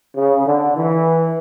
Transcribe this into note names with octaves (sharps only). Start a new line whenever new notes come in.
C#3
D3
E3